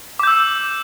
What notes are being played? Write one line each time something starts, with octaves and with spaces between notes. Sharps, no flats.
D6 E6 G6